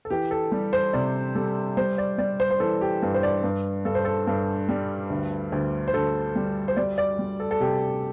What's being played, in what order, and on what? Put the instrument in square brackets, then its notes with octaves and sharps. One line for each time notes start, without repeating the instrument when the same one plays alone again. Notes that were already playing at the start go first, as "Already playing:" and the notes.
[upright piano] A4
E3 G4
A4
G3
C5
C3 D5
G3 A4
G3 C5
D5
G3 D5
C5
C5
E3 A4
G4
G2
C5
D5
G2
G2 A4
C5
A4
G2 A4
G3
D2
D2
C5
D2 A4
G3
C5
G3 D5
D5
G3
A4
A4
C3 G4